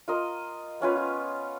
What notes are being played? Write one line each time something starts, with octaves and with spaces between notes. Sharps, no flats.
F4 A#4 D#5
B3 C#4 F4 B4
F4